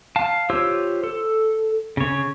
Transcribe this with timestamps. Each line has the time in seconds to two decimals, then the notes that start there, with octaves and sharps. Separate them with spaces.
0.16 F5 A5
0.50 F4 G4 C5 C#5 E6
1.04 A4
1.97 C#3 C#5